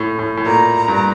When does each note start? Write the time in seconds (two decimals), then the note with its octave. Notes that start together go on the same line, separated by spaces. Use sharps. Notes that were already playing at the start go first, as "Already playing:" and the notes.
Already playing: A2
0.19 A2
0.37 A2
0.46 A#2 A#5
0.88 G2